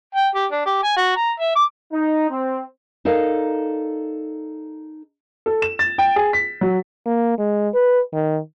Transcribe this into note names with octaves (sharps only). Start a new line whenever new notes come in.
G5
G4
D4
G4
G#5
F#4
A#5
E5
D6
D#4
C4
D#4 A4 A#4 D5 F5
A4
E7
A6
G5
G#4
B6
F#3
A#3
G#3
B4
D#3